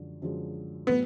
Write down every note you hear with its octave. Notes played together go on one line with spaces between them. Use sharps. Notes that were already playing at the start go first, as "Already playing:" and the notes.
Already playing: F#2 D3 F3 G#3
F#2 D3 F3 G#3
A2 F#3 B3